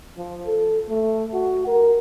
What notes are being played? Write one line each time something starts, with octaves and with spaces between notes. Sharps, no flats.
F3
A4
A3
F#4
A#4